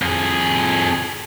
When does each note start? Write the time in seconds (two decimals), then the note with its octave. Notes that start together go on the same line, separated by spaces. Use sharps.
0.02 F2 G#4